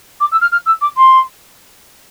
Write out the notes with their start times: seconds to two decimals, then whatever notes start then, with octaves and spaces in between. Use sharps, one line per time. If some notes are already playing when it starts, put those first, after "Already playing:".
0.20 D6
0.31 E6
0.41 F6
0.52 F6
0.66 E6
0.81 D6
0.97 C6